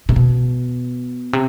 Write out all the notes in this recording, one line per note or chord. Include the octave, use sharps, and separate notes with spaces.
C3
B2
C3